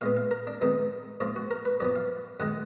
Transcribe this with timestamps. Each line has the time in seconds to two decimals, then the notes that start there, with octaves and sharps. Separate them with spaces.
0.01 A#2 G#3 B3 F5
0.17 F5
0.31 A#4
0.47 D4
0.61 F2 D#3 G#3 B3 D#4
1.20 G#2 F3 A#3 F4
1.36 F#4
1.51 A#4
1.65 B4
1.80 F#2 F3 B3 D5
1.96 F5
2.40 F#2 D#3 G#3 F#5